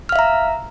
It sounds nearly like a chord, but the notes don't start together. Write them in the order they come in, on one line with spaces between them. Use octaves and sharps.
F6 F5 E5 A#5